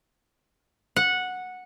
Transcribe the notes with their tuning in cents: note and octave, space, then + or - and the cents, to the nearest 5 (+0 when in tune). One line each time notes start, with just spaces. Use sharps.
F#5 -10